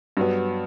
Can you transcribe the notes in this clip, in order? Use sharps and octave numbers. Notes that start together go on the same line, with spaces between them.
G2 F#3 B3